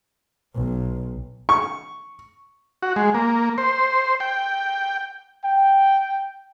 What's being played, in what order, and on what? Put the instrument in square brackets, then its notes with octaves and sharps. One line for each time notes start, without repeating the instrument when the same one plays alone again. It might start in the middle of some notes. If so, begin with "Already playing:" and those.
[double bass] B1
[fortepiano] C#6
[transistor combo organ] F#4
G#3
A#3
C5
G5
[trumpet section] G5